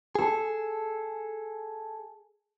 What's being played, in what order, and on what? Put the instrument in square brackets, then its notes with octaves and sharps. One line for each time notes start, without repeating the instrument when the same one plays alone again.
[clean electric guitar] G#4 A4